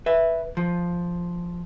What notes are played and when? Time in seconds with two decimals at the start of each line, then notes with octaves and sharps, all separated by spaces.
0.06 B4 E5
0.57 F3